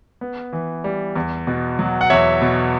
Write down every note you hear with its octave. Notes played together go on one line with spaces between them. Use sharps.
B3
E3
G3
E2
B2
F#3
F#5
E2 C#5 E5
B2